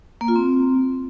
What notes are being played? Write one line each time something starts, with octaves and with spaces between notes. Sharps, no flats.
A#3
F4
C4